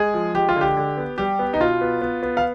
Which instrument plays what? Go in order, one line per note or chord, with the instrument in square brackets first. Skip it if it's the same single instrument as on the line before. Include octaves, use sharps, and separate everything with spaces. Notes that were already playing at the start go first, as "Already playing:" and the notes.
Already playing: [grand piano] G#3 G#4
F3
G#3 G4
F4
D3 G4
D3
B3
G3 G4
B3
D#4
B2 F4
B3
B3
B3
F5